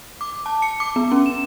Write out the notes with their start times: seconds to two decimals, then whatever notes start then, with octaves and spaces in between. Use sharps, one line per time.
0.21 D6
0.46 A5
0.62 C#7
0.80 D6
0.96 B3
1.12 C#4
1.26 E7